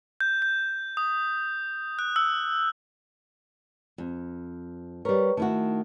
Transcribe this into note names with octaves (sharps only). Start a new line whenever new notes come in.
G6
G6
D#6
F#6
E6
F2
G3 A#4 B4 C#5 C#6
D#3 A3 E4 F#4